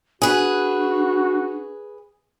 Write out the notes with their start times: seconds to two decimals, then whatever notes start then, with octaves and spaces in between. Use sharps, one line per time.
0.22 D4 F#4 G#4 B4